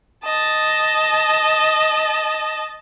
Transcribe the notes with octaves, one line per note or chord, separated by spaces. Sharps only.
D#5 A5